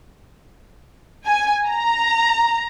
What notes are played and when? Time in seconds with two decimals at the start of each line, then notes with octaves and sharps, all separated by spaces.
1.25 G#5
1.67 A#5